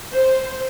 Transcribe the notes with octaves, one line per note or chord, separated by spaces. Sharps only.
C5